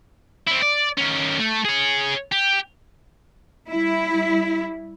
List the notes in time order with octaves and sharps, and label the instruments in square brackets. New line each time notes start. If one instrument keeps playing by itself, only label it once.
[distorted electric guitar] C4 E4
D5
D#3 C#4
A3
G#4 C#5
G4
[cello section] G3 E4